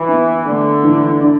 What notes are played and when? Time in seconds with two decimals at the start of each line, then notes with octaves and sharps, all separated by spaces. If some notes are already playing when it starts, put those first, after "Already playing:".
Already playing: E3 F#4
0.08 B3
0.46 D3 A3
0.84 E3
1.21 D4